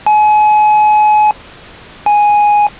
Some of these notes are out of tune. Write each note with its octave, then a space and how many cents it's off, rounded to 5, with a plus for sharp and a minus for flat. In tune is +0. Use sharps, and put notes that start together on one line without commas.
G#5 +35
G#5 +0